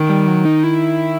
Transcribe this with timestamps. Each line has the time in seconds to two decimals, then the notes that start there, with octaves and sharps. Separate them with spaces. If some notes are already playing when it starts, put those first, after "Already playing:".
Already playing: D#3
0.09 G3
0.27 F#3
0.45 D#4
0.64 E4